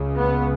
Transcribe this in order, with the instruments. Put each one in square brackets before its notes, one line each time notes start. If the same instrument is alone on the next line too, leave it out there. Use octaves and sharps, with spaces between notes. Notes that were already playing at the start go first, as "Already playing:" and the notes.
Already playing: [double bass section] C#2 C#3
B3